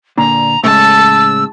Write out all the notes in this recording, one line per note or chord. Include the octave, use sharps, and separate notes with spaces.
A#2 D3 A#5
A2 C#3 G#3 A5 E6